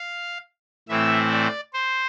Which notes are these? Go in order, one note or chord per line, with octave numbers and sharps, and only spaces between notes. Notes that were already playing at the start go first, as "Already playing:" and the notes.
Already playing: F5
A2 E3 A3 C4 E4 E5
D5
C5